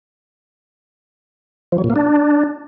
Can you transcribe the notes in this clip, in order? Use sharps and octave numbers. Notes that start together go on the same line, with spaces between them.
F3
F#3
A#2
A#3
D4